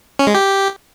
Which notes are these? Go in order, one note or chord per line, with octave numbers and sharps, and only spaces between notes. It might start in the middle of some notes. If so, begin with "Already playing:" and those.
C#4
G#3
G4